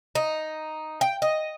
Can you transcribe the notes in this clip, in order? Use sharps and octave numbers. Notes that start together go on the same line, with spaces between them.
D#4
G5
D#5